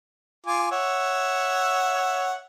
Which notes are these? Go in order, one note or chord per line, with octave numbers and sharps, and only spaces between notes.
F4 G#5 D6
C#5 E5 F#5